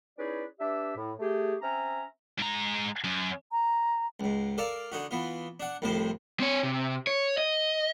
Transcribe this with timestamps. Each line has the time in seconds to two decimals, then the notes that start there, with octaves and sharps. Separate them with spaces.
0.18 C#4 D#4 E4 G#4 B4 D5
0.59 D4 G4 B4 E5
0.96 A2
1.19 A3 G4 G#4
1.61 C4 C#4 E5 A#5
2.38 G#2 A#5
3.04 F#2
3.51 A#5
4.20 C#2 G#2
4.58 A4 A#4 D5 F5
4.92 D3 D#4 F#4
5.11 E3 B3 F4
5.60 D4 F#5
5.82 C2 F2 A2 C3 C5
6.40 C4 C#5
6.63 C3
7.07 C#5
7.38 D#5